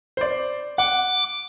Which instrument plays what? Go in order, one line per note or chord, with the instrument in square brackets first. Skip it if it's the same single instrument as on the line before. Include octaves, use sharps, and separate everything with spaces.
[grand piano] C5 D5
[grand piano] F#5 [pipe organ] D6